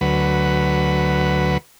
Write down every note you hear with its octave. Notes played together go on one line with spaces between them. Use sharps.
D2 F#3 B4